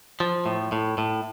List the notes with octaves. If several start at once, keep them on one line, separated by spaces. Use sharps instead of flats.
F3
A2
A2
A2